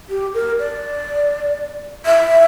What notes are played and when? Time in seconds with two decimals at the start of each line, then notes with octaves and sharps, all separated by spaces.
0.10 G4
0.34 A#4
0.59 D5
2.06 E5